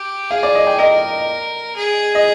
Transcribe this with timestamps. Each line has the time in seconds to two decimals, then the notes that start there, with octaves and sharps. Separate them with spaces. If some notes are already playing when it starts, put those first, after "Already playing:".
Already playing: G4
0.30 G#4 F5
0.43 D5
0.55 D#5
0.67 G5
0.79 A#4 D#5
1.76 G#4
2.15 D#5